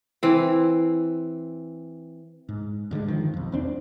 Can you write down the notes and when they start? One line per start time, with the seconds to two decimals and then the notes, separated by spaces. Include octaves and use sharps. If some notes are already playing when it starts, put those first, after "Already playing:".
0.23 E3 C4
2.49 G#2
2.91 G2 D3 E3 G#3
3.08 D#3 F3
3.34 B1 F2
3.52 E2 C4 D4